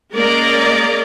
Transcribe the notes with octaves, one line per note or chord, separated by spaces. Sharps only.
G#3 A#3 C#4 A#4 D5 D#5